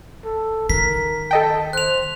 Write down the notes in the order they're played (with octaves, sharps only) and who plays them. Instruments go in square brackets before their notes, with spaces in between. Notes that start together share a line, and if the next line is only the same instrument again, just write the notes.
[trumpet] A4
[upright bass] D#3 [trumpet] A#4 [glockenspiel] B6
[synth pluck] A4 D#5 G5 [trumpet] A5
[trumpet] C5 [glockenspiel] F#6 F7